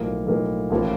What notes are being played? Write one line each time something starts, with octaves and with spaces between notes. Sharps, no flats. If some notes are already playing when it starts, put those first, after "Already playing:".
Already playing: B1 A2 F3 A#3
B1 A2 F3 A#3
A1 A2 F3 A#3